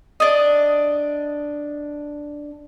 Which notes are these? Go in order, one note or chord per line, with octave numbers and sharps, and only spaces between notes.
D4 D#5